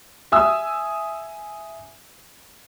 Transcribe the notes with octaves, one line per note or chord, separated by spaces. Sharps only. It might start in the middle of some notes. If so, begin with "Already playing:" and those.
E5 G#5 D#6 E6